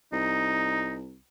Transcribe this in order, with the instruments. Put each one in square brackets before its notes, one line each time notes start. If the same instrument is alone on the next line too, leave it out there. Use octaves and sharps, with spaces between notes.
[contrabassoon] C2 [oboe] D#4